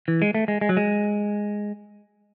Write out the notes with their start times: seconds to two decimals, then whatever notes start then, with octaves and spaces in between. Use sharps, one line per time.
0.08 E3
0.22 G#3
0.35 A3
0.48 G#3
0.61 G#3
0.69 F#3
0.77 G#3